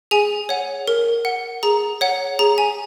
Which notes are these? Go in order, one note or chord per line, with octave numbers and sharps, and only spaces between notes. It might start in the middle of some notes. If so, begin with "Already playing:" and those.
G#4 G#5
C#5 F#5
A#4
F#5
G#4 A#5
C#5 F#5
G#4 A#5
G#5